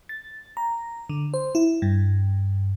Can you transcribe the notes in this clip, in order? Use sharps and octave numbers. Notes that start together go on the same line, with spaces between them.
A6
A#5
D3
C5
E4
G2